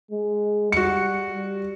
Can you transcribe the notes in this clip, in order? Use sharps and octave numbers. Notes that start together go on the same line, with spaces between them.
G#3
G3 F#4 C#7
G3